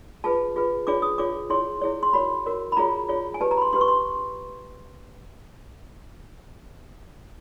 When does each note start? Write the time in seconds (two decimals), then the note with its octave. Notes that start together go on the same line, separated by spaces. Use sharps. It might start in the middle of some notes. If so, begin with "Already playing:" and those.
0.24 F4 G#4 B4 A5
0.56 F4 G#4 B4
0.87 D4 F4 G#4 C#5 D6
1.02 D#6
1.18 D4 F4 G#4 C#5 D6
1.50 E4 G#4 C#5 C6
1.81 E4 G#4 C#5
2.03 C6
2.13 F#4 A#4 C#5 B5
2.46 F#4 A#4 C#5
2.72 B5
2.77 F4 G#4 C#5 A#5
3.09 F4 G#4 C#5
3.34 G#5
3.40 D4 G4 B4 A5
3.51 A#5
3.58 B5
3.62 C6
3.73 D4 G4 B4 C6
3.81 C#6
3.88 C6